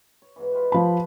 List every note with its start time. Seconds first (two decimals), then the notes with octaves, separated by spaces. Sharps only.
0.22 C#5
0.36 G#2 B2 E3
0.52 F4 G4 B4
0.72 F3 B5